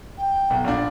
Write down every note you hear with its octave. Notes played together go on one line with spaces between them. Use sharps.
G5
B1
A#1 D4 F5